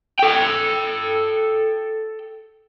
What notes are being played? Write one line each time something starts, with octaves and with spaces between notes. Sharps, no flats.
A4 G5